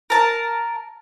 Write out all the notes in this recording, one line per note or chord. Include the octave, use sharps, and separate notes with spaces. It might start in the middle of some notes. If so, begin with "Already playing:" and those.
A#4 A5